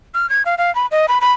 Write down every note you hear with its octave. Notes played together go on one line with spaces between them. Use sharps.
F6
G#6
F5
F5
B5
D#5
B5
B5